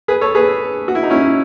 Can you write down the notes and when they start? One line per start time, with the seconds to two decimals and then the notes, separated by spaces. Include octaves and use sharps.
0.08 G#4 B4
0.21 A4 C#5
0.35 G#4 B4
0.88 F#4
0.95 E4
1.03 D#4
1.10 C#4 E4